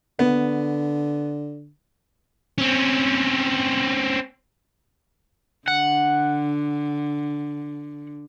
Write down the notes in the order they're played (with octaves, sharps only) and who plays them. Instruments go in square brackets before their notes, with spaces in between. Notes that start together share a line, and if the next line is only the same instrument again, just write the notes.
[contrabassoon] D3 [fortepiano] B3
[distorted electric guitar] C4 C#4
[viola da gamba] D3 [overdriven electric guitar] F#5